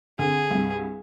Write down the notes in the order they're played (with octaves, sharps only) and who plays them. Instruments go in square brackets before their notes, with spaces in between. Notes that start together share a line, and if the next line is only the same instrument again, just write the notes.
[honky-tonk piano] D3 C4 [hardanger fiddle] G#4
[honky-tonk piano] C2 G2